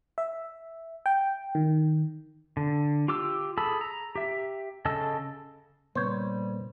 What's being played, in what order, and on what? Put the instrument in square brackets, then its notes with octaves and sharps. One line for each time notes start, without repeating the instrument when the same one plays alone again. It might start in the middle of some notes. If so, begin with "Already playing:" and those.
[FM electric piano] E5
G5
D#3
[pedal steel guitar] D3
F4 G4 D6 E6
G#4 A4 A5 B5 E6
A#5
G4 E5
C#3 A4 D#5 E6
[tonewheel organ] A#2 [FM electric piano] C#3 B3 [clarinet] G3 [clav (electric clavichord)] C5 C#5